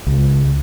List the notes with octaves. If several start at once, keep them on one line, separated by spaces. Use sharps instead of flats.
C#2